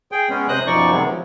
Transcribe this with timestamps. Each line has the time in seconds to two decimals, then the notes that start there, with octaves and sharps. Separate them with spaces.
0.12 G#4 G5
0.29 G#3 B3 C#4
0.48 C3 C5 D#5 D#6 F#6
0.67 F#2 B2 F3 D#4 D5 C#6
0.90 C3 D#3 F#3 G#3 B3
1.05 F3